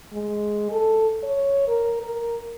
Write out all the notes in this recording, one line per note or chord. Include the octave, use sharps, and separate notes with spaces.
G#3
A4
C#5
A#4
A#4